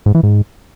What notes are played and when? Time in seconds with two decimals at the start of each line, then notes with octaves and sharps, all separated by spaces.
0.06 G#2
0.15 E3
0.23 G#2